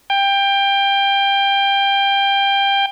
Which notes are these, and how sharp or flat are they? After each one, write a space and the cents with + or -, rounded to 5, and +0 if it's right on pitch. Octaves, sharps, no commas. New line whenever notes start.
G5 +20